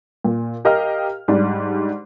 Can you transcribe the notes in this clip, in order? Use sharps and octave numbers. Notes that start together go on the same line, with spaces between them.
A#2
G4 A#4 D#5 F5 G5 F6
G#2 G3 D4